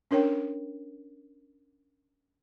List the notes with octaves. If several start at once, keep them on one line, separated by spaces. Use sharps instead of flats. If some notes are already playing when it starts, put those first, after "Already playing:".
C#4 D4 A#4 C#5 G5